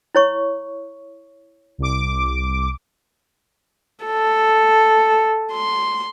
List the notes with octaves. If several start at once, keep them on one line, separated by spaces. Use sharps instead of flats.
E4 C#5 C#6
C2 D6
A4
C6